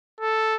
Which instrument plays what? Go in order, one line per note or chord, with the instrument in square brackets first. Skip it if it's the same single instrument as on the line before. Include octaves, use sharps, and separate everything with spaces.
[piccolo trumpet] A4